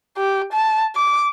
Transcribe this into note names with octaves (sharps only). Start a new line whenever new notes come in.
G4
A5
D6